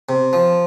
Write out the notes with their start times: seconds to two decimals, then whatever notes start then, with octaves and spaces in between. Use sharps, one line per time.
0.09 C3
0.33 F3